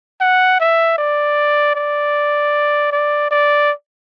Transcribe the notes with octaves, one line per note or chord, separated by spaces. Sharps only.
F#5
E5
D5
D5
D5
D5